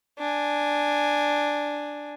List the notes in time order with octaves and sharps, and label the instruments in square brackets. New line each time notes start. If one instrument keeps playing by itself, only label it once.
[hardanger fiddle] D4 G#5